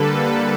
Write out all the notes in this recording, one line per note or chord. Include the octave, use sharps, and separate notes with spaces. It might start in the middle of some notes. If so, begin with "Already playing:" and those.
Already playing: D3 G3 A#3 A4 B4